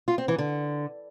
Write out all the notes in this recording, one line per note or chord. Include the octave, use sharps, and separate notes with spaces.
F4
C4
E3
D3